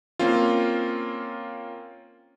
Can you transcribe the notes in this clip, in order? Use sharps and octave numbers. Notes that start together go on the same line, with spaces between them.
A#3 C4 C#4 F4